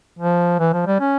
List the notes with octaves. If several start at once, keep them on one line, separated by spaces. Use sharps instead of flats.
F3
E3
F3
G3
C#4